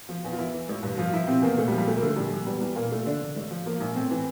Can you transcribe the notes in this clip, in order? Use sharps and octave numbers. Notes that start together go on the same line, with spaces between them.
F3
E2
F4
E3 E4
E3
A1
G2
F3 F4
F3 E4
C3 C4
E2 A#3
A#2 A3
G3
F3
G3
D2 A3
A#3
D3 A3
A#1 G3
A#1
E2 G3
E3 G3
A#2 A#3
A#2 A3
D3 D4
D3
A1
F3
F3 A#3
A#1
A2 C4
E3